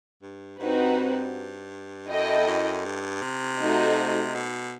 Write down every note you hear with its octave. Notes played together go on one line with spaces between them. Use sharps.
G2
G2 C4 D#4 F#4 B4
F#2 E4 A4 D#5 G5
E2
F#2
G2
C3
A3 D#4 F#4 C5 D#5
B2